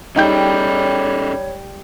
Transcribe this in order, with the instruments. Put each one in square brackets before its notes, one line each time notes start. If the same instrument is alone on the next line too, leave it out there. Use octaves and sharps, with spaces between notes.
[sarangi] G3 [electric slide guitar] C#4 G#4 A4 [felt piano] D#4 G5 G6 [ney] C#5